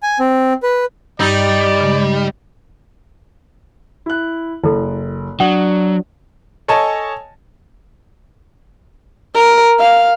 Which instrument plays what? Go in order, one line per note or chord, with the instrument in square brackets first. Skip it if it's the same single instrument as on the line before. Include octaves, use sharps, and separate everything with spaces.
[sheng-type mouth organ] G#5
C4
B4
[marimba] G2 D#5 E6 [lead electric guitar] G3 [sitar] D#4 [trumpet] D5
[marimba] C#3 G#3
[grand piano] E4 F#6
[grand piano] F#1 [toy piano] E4 A4
[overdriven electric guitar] F#3 [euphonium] D4 [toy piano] F#5 [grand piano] D#6
[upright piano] A4 C#5 D#5 G#5 A5
[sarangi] A#4
F5